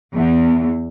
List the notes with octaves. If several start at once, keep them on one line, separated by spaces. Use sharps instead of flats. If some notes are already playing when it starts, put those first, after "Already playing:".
E2